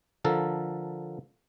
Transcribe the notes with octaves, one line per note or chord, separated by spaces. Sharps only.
D3 F3 A4 A#4